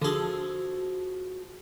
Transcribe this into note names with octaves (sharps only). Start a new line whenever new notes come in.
D3 F3 F#4 G#4 A4